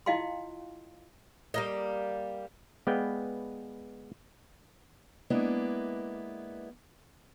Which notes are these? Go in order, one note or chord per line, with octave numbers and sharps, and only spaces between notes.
E4 F4 D#5 F5 G5 C6
G3 A#3 D#5
G#3 B3 B4 D5 F5 G5
G#3 A#3 B3 D4 E4